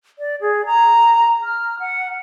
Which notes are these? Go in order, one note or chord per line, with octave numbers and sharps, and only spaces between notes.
D5
G#4
A#5
F6
F#5